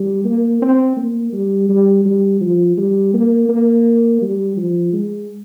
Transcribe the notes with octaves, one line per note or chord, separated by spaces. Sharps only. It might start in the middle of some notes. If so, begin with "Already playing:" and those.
Already playing: G3
A#3
C4
A#3
G3
G3
G3
F3
G3
A#3
A#3
G3
F3
G#3